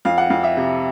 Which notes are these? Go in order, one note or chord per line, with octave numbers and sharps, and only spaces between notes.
F2 F5
F#5
F2 F5
E5
C3